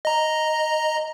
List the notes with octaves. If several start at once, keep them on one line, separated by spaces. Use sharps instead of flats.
D#5 A#5